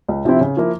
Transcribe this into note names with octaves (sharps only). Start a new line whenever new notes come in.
C#2
C3 F3 C4 E4
C#3
F3 A#3 E4